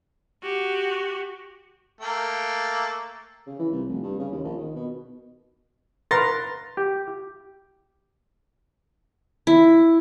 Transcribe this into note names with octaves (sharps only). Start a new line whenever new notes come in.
F#4 G4
A3 A#3 G5
C#3
E3
C2
F1
G2
C#3
D#2
A#1
D#3
B2
A#4 B4 C6 A6 A#6
G4
E4